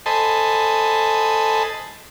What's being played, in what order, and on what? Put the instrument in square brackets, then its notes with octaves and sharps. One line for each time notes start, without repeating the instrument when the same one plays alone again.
[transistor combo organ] A4 C5 D#5 G#5 A5 B5